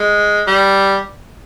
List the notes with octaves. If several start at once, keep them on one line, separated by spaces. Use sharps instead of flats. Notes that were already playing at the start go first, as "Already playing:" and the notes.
Already playing: G#3
G3